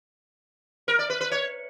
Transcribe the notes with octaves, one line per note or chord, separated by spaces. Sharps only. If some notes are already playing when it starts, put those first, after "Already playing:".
A#4
D5
B4
B4
C#5